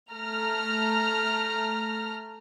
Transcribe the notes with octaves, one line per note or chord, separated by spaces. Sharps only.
A3 A#5 F6